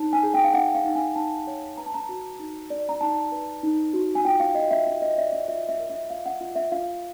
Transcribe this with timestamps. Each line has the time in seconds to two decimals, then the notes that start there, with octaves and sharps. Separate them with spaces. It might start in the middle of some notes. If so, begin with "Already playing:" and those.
Already playing: D#4 C#5 A5
0.13 G#5
0.23 G#4
0.34 G5
0.44 F5
0.54 D#4 F#5
0.75 F5
0.85 D#4
0.95 G#5
1.16 D#4 A5
1.47 C#5
1.78 B4 A#5
1.86 A5
1.94 A#5
2.09 F#4
2.39 D#4
2.70 D5
2.89 A#5
3.01 D#4 A5
3.32 B4
3.63 D#4
3.93 F#4
4.15 G#5
4.25 F4 G5
4.40 F5
4.55 F4 D#5
4.71 E5
4.86 F4 E5
5.02 D#5
5.18 D5 E5
5.32 E5
5.48 F4 E5
5.69 E5
5.79 A#4
5.90 E5
6.10 F4 F5
6.26 F#5
6.41 F4
6.56 E5
6.72 F4 F5